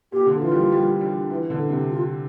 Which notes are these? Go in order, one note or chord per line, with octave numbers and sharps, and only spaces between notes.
A#2 G4
D3
F3
E3 F4
G3
F3
G3
G3
E3
D3
C3
F4